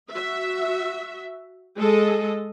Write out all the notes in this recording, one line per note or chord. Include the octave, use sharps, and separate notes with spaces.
F#4 E5
G#3 G#4 A4 D#5